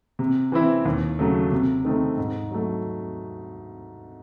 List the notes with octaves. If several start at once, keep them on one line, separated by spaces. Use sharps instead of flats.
C3
E3 C4 E4
D#2
C#3 F#3 A3
C3
D#3 A3 C4
G#2
F#3 A3